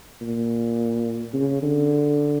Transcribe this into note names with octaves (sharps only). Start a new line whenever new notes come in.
A#2
C#3
D3